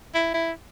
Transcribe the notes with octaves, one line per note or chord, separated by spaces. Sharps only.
E4
E4